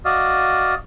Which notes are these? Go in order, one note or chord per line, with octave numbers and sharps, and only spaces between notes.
F#4 D5 D#5 F5